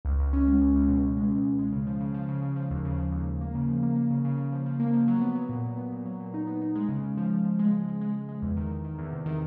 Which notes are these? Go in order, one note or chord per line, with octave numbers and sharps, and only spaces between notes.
C#2
C#2
C#4
G#3
C#2
C#2
B2
C#2
G#3
C#2
C#2
G#3
C#3
F3
C#3
F3
C#3
C#3
F3
D#2
C#3
F3
D#2
D#2
A#3
C#3
F3
A#3
A#3
C#3
C#3
C#3
F3
F3
A#3
F3
F#3
B3
F#3
A#2
A#2
B3
A#2
F#3
A#2
D#4
B3
D#4
G#3
C#3
C#3
F3
F3
F3
G#3
F3
G#3
G#3
G#3
G#3
E2
D#3
D#3
D#3
E2
C3
D#3